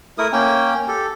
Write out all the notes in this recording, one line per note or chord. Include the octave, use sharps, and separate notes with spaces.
A3 E4 A#4 D#6
A#3 C#4 G5
G4 A4